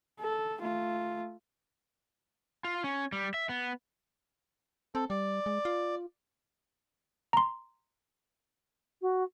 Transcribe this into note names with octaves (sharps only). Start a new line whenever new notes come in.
A4
A3 F4
F4
C#4
G3
E5
B3
C4 A4
G3 D5
G#3
F4
A#5 C6
F#4